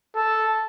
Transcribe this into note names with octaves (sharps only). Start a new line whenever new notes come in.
A4